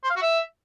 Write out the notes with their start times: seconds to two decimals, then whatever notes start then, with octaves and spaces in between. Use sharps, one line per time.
0.04 C5
0.10 F5
0.16 F#4
0.22 E5